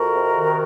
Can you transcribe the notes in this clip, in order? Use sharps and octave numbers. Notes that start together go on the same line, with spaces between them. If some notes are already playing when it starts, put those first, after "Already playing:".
Already playing: F2 F#4 A#4
C3
D#3